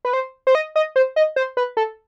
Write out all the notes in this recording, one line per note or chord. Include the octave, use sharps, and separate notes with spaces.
B4
C5
C5
D#5
D#5
C5
D#5
C5
B4
A4